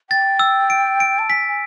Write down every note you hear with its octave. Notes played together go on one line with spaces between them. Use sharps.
G5 A6
E6
D7
D7
A5
G#5 B6
G#5